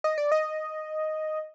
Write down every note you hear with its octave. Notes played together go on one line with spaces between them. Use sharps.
D#5
D5
D#5